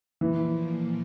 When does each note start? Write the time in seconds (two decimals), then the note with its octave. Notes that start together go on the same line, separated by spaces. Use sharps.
0.21 A#2 E3 F3 A#3